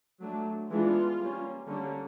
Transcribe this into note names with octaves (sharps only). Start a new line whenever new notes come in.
F#3 A3 D4
E3 G#3 B3 D4 F4
G3 A#3 C#4
D3 G3 A#3 C#4